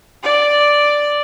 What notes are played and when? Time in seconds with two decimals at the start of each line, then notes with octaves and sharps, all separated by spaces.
0.23 D5